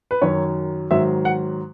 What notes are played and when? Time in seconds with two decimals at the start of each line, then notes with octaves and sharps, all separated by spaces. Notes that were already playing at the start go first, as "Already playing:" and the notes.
0.11 B4
0.22 F#2 D#3 F#3 C#5
0.91 G#2 D#3 F#3 E5
1.25 F#5